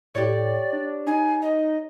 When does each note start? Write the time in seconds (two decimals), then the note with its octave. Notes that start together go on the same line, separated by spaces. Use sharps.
0.15 A2 G4 C#5 D5
0.73 D4
1.07 D#4 G#5
1.41 D#5